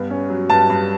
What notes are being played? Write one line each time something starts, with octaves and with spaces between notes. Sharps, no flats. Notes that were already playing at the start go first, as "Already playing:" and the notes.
Already playing: G2 B3
C#4
F#3
G2 A5
G2